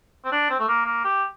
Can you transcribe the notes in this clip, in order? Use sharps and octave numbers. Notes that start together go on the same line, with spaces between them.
C4
D4
C4
A3
A#3
A#3
G4